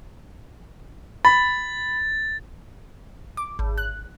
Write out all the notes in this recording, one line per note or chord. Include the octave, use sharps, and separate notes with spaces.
B5 A6
D6
G#1
F#6